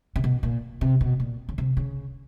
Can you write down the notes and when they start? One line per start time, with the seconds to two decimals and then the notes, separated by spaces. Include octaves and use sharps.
0.16 C3
0.24 B2
0.43 A#2
0.81 C3
1.01 B2
1.20 A#2
1.49 C#3
1.58 C3
1.77 C#3